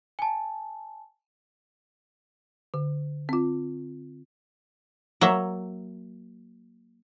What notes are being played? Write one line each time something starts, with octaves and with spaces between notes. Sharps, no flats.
G#5 A5
D3
C4 F4
F#3 A#3 E5